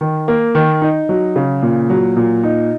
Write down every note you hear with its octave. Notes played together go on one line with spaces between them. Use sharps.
D#3
A#3
D#3
D#4
F#3
C#3
A#2
F#3
A#2
D#4